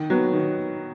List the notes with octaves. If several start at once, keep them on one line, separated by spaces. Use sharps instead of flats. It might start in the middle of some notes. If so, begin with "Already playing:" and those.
Already playing: D#3
F#3 B3
D#3